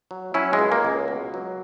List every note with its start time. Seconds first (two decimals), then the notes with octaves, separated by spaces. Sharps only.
0.11 F#3
0.34 F#3 C#4 E4
0.53 G#3
0.59 C#2
0.72 A#3
0.84 C#2
1.08 B2
1.34 F#3